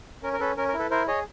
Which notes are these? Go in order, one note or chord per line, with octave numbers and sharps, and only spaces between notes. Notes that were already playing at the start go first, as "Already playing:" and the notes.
C#4 A#4
A#4
C#4 A4 B4
C#4 A#4
A#4
E4
A4 B4
E4 A#4 C5
G#4 C#5 D#5